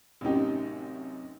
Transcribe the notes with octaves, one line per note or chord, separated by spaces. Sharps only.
A1 F#2 C3 C#4 D#4 G4